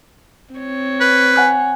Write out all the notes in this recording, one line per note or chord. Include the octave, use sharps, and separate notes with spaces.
C4 C#5
B4
F#5 G#5 F#6